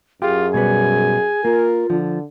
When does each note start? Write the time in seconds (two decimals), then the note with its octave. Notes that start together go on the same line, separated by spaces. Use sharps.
0.22 F#2 F4 G4 G#4
0.54 B2 G3 B3 G#5
1.45 A#3 F4 A#4
1.90 D3 F3